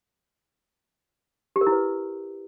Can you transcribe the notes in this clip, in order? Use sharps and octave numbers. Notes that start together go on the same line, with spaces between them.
G4
A#4
E4
B4